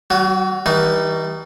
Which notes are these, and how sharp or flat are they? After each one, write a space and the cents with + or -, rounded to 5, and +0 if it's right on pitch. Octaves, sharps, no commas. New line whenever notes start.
F#3 +45 F#4 +0
E3 -45 G3 +0 D#4 -20